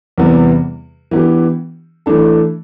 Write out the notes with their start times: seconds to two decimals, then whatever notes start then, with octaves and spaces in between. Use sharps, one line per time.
0.18 E2 C3 E3 G3 B3
1.11 E3 B3 D4 G4
2.06 E3 A3 D4 A4